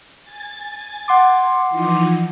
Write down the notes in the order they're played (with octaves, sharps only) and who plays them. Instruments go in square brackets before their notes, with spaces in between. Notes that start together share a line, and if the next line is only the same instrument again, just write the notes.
[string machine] G#5 A6
[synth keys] F#5 C6 D6
[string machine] E3 F3 D#4